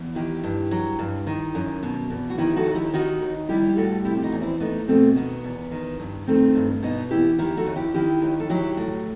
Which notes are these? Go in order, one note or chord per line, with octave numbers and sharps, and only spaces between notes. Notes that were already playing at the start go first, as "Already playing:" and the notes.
Already playing: E2
D#3 E4 G4
G2
F#3
G2
D#3
F#2
B2
E2
F#4
D#3 E4 G4
F#4 A4
D#2
E4 G4
D#3 D#4 F#4
D#2
G3 E4 G4
G4
A2 F#4 A4
C3 E4 G4
G4
D#4 F#4
E2
C4 E4
A3 B3 D#4
B2 A3 C4
D#3 B3
E2
D#3
G2
D#3 A3 C4
G2
B2 B3 D#4
E2 E4 G4
D#3 E4 G4
F#4 A4
D#2
E4 G4
D#3 E4 G4
D#2
A4
F#3 E4 G4
A2